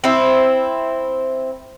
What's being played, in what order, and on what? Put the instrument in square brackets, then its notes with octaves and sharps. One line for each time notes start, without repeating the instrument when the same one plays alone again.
[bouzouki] C4 E4